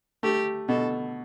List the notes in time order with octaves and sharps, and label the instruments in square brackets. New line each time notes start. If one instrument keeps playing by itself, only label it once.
[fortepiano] A3 [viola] G4
[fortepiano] B2 [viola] A4